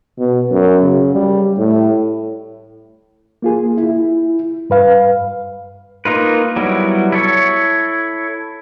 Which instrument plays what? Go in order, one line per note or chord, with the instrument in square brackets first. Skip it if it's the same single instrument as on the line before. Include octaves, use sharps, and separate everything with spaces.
[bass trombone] B2
F#2
C#3
G3
A2
[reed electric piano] A#3 F4 G#4
E4
G2 B4 F5
[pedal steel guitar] A#3 D#4 F4 B4
F#3 G3 B3 E4
E4 A4 C#5